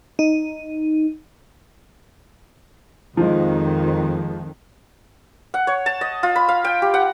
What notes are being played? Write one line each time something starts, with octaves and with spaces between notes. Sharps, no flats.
D#4
F2 D#3 F3 G#3
F#5
C#5
A5
D#5
F4
B5
F5
G5
G4
F#5